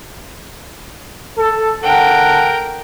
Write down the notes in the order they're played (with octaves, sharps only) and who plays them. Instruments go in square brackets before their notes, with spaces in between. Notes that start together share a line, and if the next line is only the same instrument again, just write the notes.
[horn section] A4
[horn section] D3 A4 F#5 [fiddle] A#4 G5